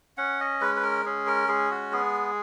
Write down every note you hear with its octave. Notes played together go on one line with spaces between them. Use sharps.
C#4 F#5
D#5
G#3 B4
B4
A#4
C#4 G#4
A#4
G#3 G#4
F#4
B3 G#4